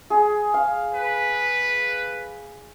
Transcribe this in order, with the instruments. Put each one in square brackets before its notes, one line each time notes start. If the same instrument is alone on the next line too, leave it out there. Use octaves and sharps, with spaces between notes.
[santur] G#4
F5
[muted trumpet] B4